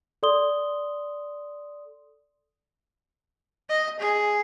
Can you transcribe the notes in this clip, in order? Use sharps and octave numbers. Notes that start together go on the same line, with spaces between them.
A4 D5 C6 D#6 G7
D#5
G#4